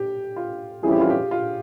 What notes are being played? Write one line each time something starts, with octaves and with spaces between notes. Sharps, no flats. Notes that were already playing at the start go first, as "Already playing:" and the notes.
Already playing: G4
F4
F2 E3 G3 C#4 E4 G#4
G4
F4
G4
F4